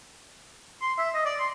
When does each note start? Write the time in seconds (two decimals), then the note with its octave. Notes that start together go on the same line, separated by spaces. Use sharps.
0.81 C6
0.99 E5
1.14 D#5
1.25 D5
1.39 C6